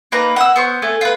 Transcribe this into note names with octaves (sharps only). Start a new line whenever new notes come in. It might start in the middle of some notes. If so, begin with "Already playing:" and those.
A#3 D#4 B4 A#5
F#5 E6
B3 C5 C#6
A3 A4 G#5
F4 B4